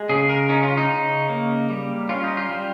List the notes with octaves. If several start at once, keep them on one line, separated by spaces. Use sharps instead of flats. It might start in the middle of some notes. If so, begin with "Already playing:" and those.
Already playing: G#3
C#3 G#4
A#4
C#4 D#4
F4
D#4
C#3
A#3
G3
C#4 F4
D#4
F4
G3